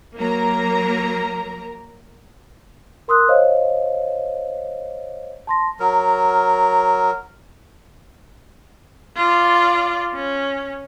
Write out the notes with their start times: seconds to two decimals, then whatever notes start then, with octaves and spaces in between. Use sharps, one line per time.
0.17 F#3 A#3 A#4 A#5
3.08 A#4 C6 D#6 E6 F#6
3.28 C5 C#5 D#5 F5
5.47 A5 C6 A#6
5.80 F#3 A#4
9.16 F4 D5
10.14 C#4